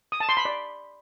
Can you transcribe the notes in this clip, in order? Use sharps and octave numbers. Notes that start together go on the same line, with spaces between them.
D#6
A5
C6
B5
D5